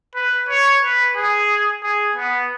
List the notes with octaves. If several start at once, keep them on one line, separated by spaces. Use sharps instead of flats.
B4
C#5
B4
G#4
G#4
B3